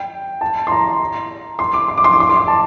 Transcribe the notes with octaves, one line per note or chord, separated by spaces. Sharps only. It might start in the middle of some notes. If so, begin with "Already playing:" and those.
Already playing: G5
A5
C6
A#5
C6
D6
C6
D6
C6
D6
C6
D6
C6
A5